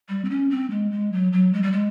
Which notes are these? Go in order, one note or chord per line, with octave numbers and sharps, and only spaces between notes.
G3
C4
C#4
C4
G#3
G#3
F#3
F#3
G#3
G3
G#3